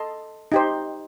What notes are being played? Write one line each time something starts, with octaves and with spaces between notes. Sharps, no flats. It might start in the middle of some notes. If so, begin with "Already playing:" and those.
Already playing: A4 D#5 A5 C6
D#4 G4 C5